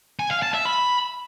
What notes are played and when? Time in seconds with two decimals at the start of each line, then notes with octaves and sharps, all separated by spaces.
0.19 G#5
0.31 F5
0.42 A5
0.54 E5
0.65 B5